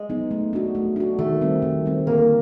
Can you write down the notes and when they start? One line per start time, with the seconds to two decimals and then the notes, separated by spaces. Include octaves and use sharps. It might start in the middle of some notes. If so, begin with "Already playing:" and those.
Already playing: G#3
0.09 F#3 B3 D#4
0.31 A3
0.53 D4 F#4
0.75 A3
0.96 D4 F#4
1.19 D#3 A3
1.41 G3 C4
1.62 D#3
1.86 G3 C4
2.07 D3 A#3